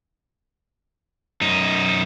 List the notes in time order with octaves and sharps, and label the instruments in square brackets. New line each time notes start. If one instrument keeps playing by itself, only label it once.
[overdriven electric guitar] F#2 D#4